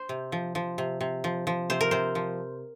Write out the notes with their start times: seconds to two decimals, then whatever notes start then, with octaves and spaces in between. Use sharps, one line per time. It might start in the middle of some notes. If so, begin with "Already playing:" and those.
Already playing: C5
0.09 C3
0.32 F3
0.55 F3
0.78 C3
1.01 C3
1.24 F3
1.47 F3
1.70 C3 C5
1.81 A#4
1.91 C3 C5
2.15 F3